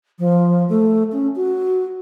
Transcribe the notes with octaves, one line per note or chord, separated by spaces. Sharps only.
F3
A3
C#4
F#4